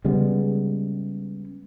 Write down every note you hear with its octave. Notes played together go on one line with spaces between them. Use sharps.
C#3 G3 G#3 B3